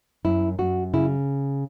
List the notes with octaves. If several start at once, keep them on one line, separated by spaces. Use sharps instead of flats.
F#2 E4
F#2 F#4
C#3 E4